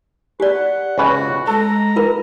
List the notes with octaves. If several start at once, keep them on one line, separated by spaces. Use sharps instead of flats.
G4 B4 D5
F#5
C#2 C#4 F#4 B4
G#3 A4 A#5
F4 A#4 B4